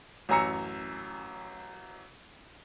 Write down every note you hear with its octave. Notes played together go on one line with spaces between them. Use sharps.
A1 F#2 G#5 A#5 E6 C#7